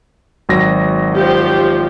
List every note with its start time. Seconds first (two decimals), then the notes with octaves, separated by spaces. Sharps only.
0.49 G#1 F#3 A#6
1.15 F3 G4